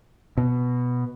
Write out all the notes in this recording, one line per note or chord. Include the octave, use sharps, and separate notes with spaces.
B2